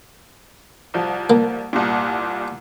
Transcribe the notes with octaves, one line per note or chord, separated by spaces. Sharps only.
C2 F3
A#3
C2 A#2